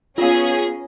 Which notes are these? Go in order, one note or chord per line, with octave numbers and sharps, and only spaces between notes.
B3 C#4 F4 G#4 F5